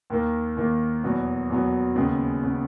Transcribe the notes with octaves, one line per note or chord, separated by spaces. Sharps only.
D#2 D#3 A#3
D#2 D#3 A#3
E2 B2 F#3 B3
E2 B2 F#3 B3
D#2 C#3 G#3 B3
C#3 G#3 B3